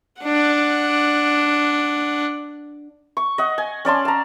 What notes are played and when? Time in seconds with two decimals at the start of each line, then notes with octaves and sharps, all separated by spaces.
0.22 D4 F#5
3.17 C#6
3.38 D#5 F#5
3.58 G#5
3.85 C#4 D5 A5 C6
4.05 A5 A#5